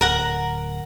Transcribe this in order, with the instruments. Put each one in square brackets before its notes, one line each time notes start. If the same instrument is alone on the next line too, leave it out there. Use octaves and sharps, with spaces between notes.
[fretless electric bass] D1 [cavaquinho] A#4 F#5 A#5